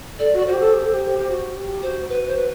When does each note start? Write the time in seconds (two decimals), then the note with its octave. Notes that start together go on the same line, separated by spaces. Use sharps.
0.19 A4 D5
0.33 F#4
0.38 D5
0.46 F#4 C5
0.53 G4
0.60 A4
0.74 G4
0.84 A4
0.93 G4
1.18 G4
1.28 F#4
1.55 G4
1.83 F#4 C5
2.09 B4
2.27 C5
2.37 B4